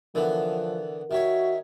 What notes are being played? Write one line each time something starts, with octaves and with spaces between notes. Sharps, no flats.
D3 E3 F3 B3 A#4
D#3 F#4 C#5 E5